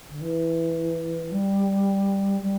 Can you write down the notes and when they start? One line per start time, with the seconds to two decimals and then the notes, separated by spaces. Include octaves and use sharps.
0.10 D3
0.21 E3
1.31 G3
2.40 G3